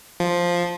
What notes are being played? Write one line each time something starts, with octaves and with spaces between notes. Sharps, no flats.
F3